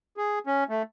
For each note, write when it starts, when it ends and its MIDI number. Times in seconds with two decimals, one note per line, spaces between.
0.17 0.39 68
0.47 0.64 61
0.69 0.82 57